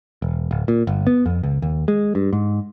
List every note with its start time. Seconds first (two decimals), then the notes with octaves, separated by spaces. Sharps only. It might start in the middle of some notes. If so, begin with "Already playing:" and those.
0.22 E1
0.51 D1
0.68 A#2
0.87 G1
1.07 B3
1.26 F2
1.43 C#2
1.62 D#2
1.88 G#3
2.15 G2
2.33 G#2